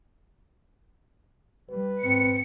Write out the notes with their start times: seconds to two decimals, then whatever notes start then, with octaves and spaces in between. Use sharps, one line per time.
1.70 G3 B4
2.03 G#2 C4 C#7